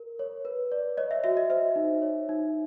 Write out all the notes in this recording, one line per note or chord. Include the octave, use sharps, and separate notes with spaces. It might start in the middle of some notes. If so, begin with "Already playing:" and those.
Already playing: A#4
C#5
B4
D5
C#5 D#5
E5
F#4 E5
D#5
C5 E5
D#4
C#5
D#4